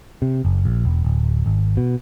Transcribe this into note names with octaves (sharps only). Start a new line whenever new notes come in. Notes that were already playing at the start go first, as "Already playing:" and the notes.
C3
F#1
A#1
E1
D1
G#1
B2